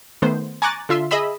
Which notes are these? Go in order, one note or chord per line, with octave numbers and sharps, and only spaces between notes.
D#3 A3 B3 C5
G#5 A#5 C#6 D6 F#6 A6
D3 F4 E5 C6
G#4 D#5 E5 B5 E6